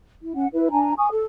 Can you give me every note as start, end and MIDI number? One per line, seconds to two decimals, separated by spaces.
0.22 0.33 64
0.35 0.46 61
0.35 0.46 78
0.53 0.69 64
0.53 0.69 71
0.71 0.93 62
0.71 0.93 80
0.71 0.93 82
0.97 1.07 80
0.97 1.07 85
0.97 1.07 87
1.12 1.25 69